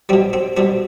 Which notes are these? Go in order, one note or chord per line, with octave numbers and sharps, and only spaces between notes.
B2 G3 C4
C4
B2 G3 C4